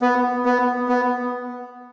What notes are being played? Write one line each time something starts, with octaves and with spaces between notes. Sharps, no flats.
B3
B3
B3